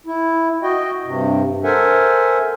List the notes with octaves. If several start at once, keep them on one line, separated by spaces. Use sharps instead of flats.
E4
F#4 D#5 G5
G2 C3
A4 A#4 C5 E5 F#5 G#5